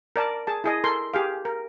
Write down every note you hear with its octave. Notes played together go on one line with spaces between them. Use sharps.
A#4 D5 A5
G#4 A5
E4 G#4 D#5
A4 A#4 C6
G4 G#4 F5
A#4